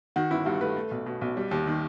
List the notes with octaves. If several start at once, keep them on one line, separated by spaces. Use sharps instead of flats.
D#3 F#4
G1 E4
G2 F#4
A3 B4
A3
B1
B2
B1
G3
D#2
D#3